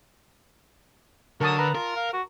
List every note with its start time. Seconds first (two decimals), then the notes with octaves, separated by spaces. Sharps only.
1.41 D3 F#3 A#4 A5 D#6
1.59 B4 A#5
1.75 F4 A#4
1.96 F5
2.13 F#4